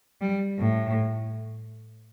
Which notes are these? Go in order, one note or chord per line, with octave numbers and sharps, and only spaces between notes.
G3
A2